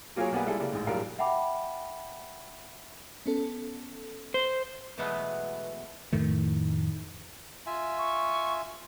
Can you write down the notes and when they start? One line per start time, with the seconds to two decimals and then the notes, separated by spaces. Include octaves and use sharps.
0.16 F#3 A#3 F4 G#4 A#4 C#5
0.32 B1 G3 A#3 B3 F#5 G#5
0.46 G3 G#3 E4 G#4 A4
0.59 C#3 G3 A#3
0.72 A1 G#2
0.87 A#1 F#3 G3 A#4 F5
1.19 E5 F#5 G5 A5 B5 D6
3.26 B3 C#4 A4
4.34 C5
4.98 B2 E3 F#3 G#3 A3 B3
6.13 F2 A2 D#3 A3
7.67 F4 E5 G#5
7.98 C#6